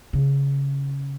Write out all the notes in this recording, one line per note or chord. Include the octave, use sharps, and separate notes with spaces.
C#3